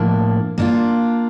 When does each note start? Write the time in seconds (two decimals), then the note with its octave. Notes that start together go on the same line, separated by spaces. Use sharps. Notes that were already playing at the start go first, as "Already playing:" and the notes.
Already playing: A2 F3 A#3 D4
0.58 A#3 D4 F4